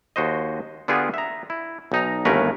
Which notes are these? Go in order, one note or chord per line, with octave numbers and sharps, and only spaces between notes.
D#2 F#4 C5 D#5
D3 B3 D4 F4 G4 G#4
E5 A#5
E4
B1 D#4 A#5
G1 D#2 A3 C#4 A#4 B4